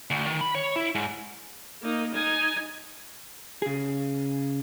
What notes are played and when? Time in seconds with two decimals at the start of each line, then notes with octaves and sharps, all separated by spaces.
0.10 D2
0.27 D#3
0.41 B5
0.55 C#5
0.76 E4
0.95 G#2
1.82 A#3 D#4
2.14 D#4 G#5
3.62 C#3 G#4